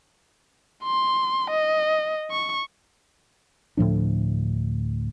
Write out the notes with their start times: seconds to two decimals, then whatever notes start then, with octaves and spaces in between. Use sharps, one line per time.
0.84 C6
1.50 D#5
2.31 C#6
3.77 D2 A2 F3 D4